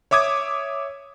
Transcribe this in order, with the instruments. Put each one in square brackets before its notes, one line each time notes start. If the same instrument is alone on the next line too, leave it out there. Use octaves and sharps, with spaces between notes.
[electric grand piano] C#5 E5 D6 D#6 G#6